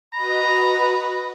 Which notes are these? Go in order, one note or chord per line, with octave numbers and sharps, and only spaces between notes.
F#4 B4 D#5 A#5 B5